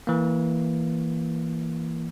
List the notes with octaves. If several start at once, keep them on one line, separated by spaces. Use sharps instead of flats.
E3 A#3